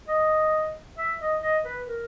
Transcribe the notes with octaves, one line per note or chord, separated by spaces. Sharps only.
D#5
E5
D#5
D#5
B4
A#4